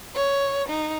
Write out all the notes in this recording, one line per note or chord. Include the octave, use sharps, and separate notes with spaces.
C#5
D#4